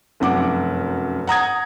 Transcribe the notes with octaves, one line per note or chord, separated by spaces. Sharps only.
F1 F#2 F#5 D6
F#5 A#5 D#6 G#6